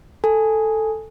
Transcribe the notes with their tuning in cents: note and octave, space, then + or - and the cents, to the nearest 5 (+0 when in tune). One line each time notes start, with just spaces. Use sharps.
A4 +0 G#5 -5